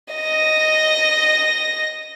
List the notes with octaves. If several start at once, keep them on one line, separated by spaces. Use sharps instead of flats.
D#5 A#6